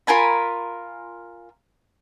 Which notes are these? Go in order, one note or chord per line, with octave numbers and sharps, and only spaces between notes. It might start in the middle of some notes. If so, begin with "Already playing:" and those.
F4 A#4 G#5 B5